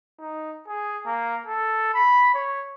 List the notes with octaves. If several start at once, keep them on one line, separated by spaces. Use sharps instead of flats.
D#4
G#4
A#3
A4
B5
C#5